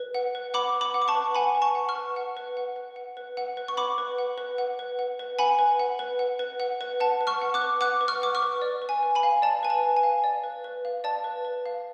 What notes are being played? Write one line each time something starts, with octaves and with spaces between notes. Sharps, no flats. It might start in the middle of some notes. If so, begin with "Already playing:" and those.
Already playing: B4
F#5
B4
F#5 B5 D6
B4
B5 D6
F#5
D6
A5 C#6
B4
F#5 G#5 B5
B4
A5 C#6
F#5
C#6 F6
B4
F#5
B4
F#5
B4
F#5
B4
F#5
B4
C#6
F#5 B5 D6
B4
F#5
B4
F#5
B4
F#5
B4
F#5 G#5 B5
B4
F#5
B4
F#5
B4
F#5
B4
F#5 A5
B4
C#6 F6
F#5
D6 F#6
B4
F#5 D6 F#6
B4
C#6 F6
F#5 D6
C#6 F6
B4
D5
B4
G#5
B4
G#5 B5
F5
D5 A5
B4 G#5
A5
B4
G#5
F5
D5
B4
B4
F5
D5 A5
B4
B4
F5